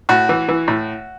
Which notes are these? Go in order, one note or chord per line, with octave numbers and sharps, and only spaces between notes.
A2 F#4
E3
E3
A2